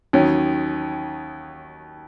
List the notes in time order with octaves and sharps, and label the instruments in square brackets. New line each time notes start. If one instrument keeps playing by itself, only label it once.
[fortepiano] D#2 D#3 F#3 C#4